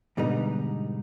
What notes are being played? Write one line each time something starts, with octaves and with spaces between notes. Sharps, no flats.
G#2 B2 D3 G3 B3 D#4